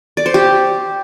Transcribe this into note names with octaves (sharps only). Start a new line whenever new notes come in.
D5
C5
G4